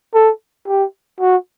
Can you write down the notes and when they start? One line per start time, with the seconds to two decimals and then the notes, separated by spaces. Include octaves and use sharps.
0.14 A4
0.68 G4
1.20 F#4